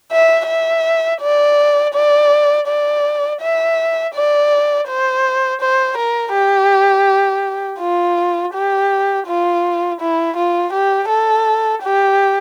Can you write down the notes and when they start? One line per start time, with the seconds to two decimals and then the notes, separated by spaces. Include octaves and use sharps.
0.12 E5
0.47 E5
1.21 D5
1.94 D5
2.67 D5
3.41 E5
4.15 D5
4.88 C5
5.61 C5
5.97 A#4
6.33 G4
7.80 F4
8.54 G4
9.27 F4
10.00 E4
10.36 F4
10.72 G4
11.09 A4
11.83 G4